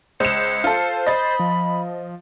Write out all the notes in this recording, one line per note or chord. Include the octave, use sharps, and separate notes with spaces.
C#2 C5 C#7 E7
F4 A4
D#5 B5 A6
F3